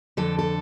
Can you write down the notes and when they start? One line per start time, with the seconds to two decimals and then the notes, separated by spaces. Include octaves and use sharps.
0.17 F2 D3 A4
0.39 A4